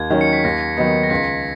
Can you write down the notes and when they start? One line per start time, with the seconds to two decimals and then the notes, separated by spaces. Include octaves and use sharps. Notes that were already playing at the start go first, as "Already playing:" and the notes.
Already playing: D#2 G#6
0.10 D#3 F#3 C#4
0.21 C#7
0.33 B6
0.44 D#2 A#6
0.77 D#3 F#3 B3 D#4
1.03 A#6
1.10 C#2 B6